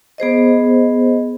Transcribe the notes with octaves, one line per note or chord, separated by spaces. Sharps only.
B3 G#4 C5 D#5